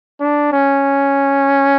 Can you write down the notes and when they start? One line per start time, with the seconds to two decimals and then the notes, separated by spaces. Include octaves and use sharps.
0.20 D4
0.52 C#4